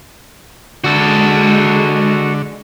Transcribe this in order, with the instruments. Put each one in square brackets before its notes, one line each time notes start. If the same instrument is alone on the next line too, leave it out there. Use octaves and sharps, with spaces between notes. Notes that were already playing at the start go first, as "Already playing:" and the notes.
[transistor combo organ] D3 [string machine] G#3 [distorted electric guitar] F#4 A4